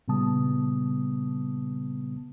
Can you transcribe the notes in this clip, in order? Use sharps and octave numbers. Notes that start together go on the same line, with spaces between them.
A#2 C#3 G3 B3 A5 D#6